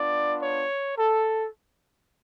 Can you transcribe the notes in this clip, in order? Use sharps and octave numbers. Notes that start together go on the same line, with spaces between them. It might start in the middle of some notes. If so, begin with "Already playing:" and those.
Already playing: B3 D4 F4 D5
C#5
A4